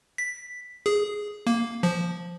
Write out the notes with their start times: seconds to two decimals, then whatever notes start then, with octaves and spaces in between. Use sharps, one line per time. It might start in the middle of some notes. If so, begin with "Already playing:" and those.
0.18 B6
0.86 G#4
1.47 A#3
1.83 F3